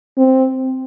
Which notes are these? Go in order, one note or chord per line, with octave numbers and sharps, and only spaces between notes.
C4